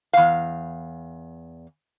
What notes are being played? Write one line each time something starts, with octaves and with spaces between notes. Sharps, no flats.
E2 F5